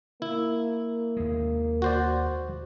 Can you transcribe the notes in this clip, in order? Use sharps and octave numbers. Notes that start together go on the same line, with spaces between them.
A#3 E4
D#2 G#3
F#4 C5 D5